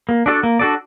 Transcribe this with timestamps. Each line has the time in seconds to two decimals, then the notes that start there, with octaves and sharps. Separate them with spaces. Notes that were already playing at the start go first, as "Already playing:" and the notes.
0.09 A#3
0.26 D4 F#4 A4 D5
0.43 A#3
0.59 D4 F#4 A4 D5